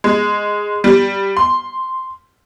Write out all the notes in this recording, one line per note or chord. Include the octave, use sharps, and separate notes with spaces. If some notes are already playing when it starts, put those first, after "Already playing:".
G#3
G3
C6